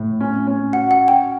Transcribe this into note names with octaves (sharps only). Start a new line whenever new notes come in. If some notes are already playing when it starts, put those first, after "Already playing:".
Already playing: A2
C#4
C#4
F#4 F#5
F#5
F#4
G5